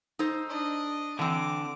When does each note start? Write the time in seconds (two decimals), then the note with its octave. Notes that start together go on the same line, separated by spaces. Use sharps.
0.19 D#4 A4 C5
0.49 D4 D#5
1.19 D3 E3 C4 D6